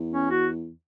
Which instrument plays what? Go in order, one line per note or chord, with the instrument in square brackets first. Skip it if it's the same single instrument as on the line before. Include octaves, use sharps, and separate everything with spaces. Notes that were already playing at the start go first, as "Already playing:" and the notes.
Already playing: [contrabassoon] E2
[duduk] C#4
F#4